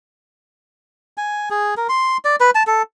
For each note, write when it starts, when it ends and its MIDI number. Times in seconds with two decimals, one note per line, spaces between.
1.17 1.49 80
1.50 1.74 68
1.77 1.87 70
1.89 2.17 84
2.25 2.36 74
2.40 2.50 71
2.55 2.63 81
2.67 2.82 69